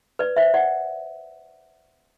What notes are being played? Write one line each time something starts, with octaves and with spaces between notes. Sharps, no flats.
B4 D5
C5 E5
D5 F#5